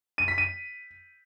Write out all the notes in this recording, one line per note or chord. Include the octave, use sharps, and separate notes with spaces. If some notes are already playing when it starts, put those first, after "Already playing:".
D#7
B6
D#7